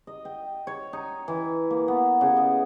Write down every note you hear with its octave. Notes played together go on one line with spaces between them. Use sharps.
D#5
G5
C#5
D#4
E3
A#3
B3
C#3
D#5